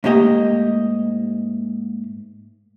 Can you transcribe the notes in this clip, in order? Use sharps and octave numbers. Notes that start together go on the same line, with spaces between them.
G#2 A3 A#3 G4 D#5